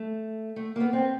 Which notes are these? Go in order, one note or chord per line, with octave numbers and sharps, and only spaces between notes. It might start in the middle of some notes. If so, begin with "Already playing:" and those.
Already playing: A3
A3
A#3
B3
C4